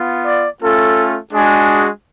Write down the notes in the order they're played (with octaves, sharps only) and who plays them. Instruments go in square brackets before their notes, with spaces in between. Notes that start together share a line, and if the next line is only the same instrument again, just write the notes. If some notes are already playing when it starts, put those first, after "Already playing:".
Already playing: [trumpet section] B3 F4
D5
A3 C#4 F4 A4
G#3 D4 F#4 G#4